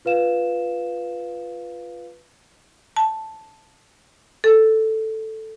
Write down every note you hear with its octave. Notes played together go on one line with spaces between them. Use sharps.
F4 B4 F5 E7
A5
A4